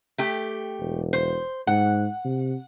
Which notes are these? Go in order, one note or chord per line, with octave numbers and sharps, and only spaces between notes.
A3 G4
E1
C5
G#2 F#5
C3